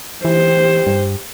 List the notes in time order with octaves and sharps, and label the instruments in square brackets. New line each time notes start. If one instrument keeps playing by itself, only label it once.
[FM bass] E3 [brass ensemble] G4 [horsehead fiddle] C5
[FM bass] G2